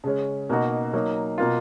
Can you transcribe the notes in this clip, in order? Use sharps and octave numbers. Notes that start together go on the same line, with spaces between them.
C#3 G#3 C#4
B2 A#3 D#4 F#4
F#3 A#3 D#4
B2 A#3 F4